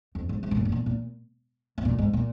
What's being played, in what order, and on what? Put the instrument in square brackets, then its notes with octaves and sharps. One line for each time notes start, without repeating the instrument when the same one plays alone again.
[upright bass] F2
G#2
G#2
C3
A#2
G#2
A#2
A#2
G#2
A#2
G#2
A#2